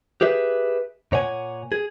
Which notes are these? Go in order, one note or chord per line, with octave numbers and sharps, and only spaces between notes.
G4 G#4 B4 E5
A#2 C#5 F#5 G#5
G#4